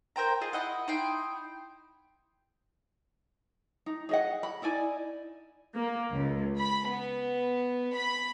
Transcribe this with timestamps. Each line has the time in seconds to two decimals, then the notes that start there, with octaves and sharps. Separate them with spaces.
0.16 A#4 C5 G5 A#5
0.41 F4 G#4 D#5
0.53 E4 D#5 F#5
0.88 D#4 E4 G5 C6
3.86 D#4
4.09 G#4 D#5 F#5
4.43 B5
4.62 D#4 E4 D5 G#5
5.76 A#3
6.13 C#2
6.58 B5
6.88 B3
7.96 B5